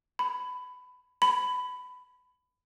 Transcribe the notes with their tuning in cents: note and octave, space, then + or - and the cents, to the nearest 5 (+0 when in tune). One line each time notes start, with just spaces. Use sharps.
B5 +20
B5 +20